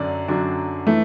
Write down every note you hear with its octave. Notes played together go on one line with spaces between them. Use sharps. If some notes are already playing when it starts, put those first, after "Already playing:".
Already playing: F#2 D3 F#3 D5
F#2 D3 F#3 D4
E3 A3